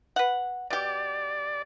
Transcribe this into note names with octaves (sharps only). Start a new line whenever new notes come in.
B4 F#5
B2 G4 D5